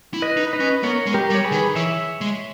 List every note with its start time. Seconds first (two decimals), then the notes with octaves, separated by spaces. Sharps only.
0.14 E4
0.22 B4 D#5
0.37 D#4
0.53 B4 D#5
0.60 C#4
0.83 B3 A#4 C#5
1.06 G#3
1.14 G4 A#4
1.30 G3
1.35 C#5
1.44 G#4 B4
1.52 D#3
1.75 E3 C#5 E5
2.21 G#3